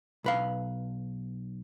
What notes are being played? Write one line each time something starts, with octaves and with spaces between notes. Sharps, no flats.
B1 B4 F5